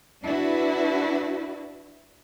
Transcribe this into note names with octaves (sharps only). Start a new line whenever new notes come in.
D4 E4 F#4 B4